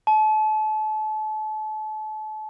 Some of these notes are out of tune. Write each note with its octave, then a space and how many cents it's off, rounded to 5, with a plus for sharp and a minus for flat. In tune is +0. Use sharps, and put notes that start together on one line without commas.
A5 -35